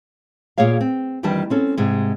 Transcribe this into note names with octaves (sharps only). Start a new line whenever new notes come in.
A#2 A#3 G#4 C#5 F5
C4
F2 D#3 E3 G3 D4 A5
C4 C#4 A4
G#2 C3 G#3